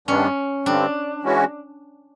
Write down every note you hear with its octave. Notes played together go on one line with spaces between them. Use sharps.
G2 D#3 G3 B3 C#4 D4
G2 D3 G3 C4 D4
E3 G#3 C#4 F#4